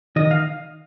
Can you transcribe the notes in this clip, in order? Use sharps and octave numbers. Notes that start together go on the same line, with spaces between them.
D#3 D#5
F5